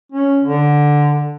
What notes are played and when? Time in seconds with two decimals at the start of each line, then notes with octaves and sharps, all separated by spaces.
0.12 C#4
0.44 D3